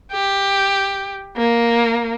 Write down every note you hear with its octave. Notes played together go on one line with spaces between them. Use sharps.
G4
A#3